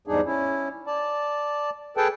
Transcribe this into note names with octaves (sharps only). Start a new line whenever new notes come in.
E2 G#2 G3 D4 D#4 G#4
C#4 E4
D5 A5
G#4 A4 B4 G5 A5